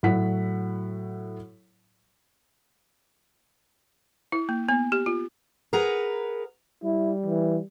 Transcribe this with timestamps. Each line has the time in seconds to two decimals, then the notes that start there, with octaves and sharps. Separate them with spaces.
0.03 A2 F#3 E4 F#5 B6
4.32 E4
4.49 A#3
4.69 B3
4.92 G4
5.06 F4
5.73 G#4 A#4 B4 F#5 A#5
6.84 G3 E4
7.26 E3